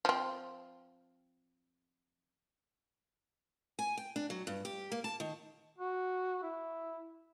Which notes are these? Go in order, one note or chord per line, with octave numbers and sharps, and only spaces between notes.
F3 C4
G#5
G5
D4
F#3
G2
G4
A#3
A5
D#3
F#4
E4